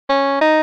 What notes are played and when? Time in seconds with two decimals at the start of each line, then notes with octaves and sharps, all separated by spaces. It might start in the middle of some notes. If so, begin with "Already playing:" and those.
0.09 C#4
0.41 D#4